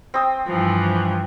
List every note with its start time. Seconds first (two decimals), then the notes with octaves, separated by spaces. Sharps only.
0.14 C4 D#6
0.46 G2 E3 F3